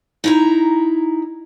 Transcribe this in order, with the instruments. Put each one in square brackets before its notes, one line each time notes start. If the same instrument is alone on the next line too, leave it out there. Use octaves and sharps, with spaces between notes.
[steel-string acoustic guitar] D#4 E4 A#5